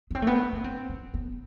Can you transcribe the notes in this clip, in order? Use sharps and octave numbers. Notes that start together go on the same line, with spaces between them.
B3
C4
A3
B3
D4
C4
D4
B3